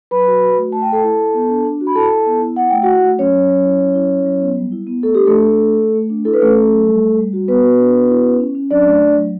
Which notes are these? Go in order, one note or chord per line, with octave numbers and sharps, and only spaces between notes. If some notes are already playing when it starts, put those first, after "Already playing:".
F#3 B4 B5
F#4
F#4
A3
A3 A5
G5
A3 A4 A5
E4
E4
B3
D4
D4
F#4
B5
E4 A4 A5
E4
B3
E4
E4 F#5
A3 G5
E4 F#4 F#5
A3
F#3 C#4 C#5
F#3
F#3
E4
F#3
E4
E4
F#3
B3
G3
E4
B3
A3 A4
D4 G4
A3 A4
D4
A3
A3
A3
A3
D4
E4 A4
B4
A3 C#4 A4
C#4
F#3
G3
G3
G3
F#4
B3 F#4 B4
F#4
D4
F#4
E4
C#4
C#4
C#4
F#3 D4 D5
A3
A3
F#3